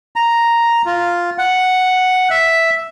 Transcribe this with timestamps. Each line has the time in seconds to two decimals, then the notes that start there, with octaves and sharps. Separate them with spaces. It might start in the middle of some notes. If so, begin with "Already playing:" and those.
0.16 A#5
0.86 F4
1.38 F#5
2.30 E5